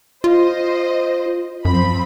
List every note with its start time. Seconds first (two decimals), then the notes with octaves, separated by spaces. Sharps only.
0.24 F4 C5 D#5
1.65 F#2 F3 C4 B5